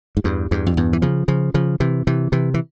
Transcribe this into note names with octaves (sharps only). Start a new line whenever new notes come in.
G#2
E2 G2
E2 G2
F2
E2 G2
E3
C#3 F3
C#3 F3
C#3 F3
C3 E3
C3 E3
C3 E3
E3